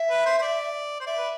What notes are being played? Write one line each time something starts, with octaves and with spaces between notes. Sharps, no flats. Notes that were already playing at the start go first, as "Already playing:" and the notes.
Already playing: E5
B4
C5
C5
D5
C5
D5 E5
B4